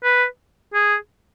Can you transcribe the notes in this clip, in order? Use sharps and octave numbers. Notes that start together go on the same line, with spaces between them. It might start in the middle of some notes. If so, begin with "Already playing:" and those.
B4
G#4